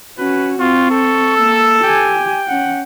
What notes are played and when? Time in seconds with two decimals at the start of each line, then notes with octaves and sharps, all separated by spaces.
0.18 C#4 F#4 B4
0.60 C4 F4 C#6
0.91 A4
1.36 A#3 E6
1.84 G4 G5 G#5
2.48 C#4 F#5